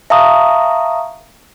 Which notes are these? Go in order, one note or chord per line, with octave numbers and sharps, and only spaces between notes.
E5 F5 A5 A#5 C#6 D#6